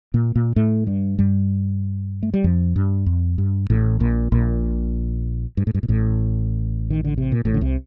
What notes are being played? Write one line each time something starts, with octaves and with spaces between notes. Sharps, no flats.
A#2 A#3
A#2 A#3
A2 A3
G2 G3
G2 G3
A3
G3
F2 F3
G2
F2
G2
A1 A2
A#1 A#2
A#1 A#2
G2
A2
G2
A#2
A1 A2
D#3
D3
C3
A#2
A1 A2
D3
C2 C3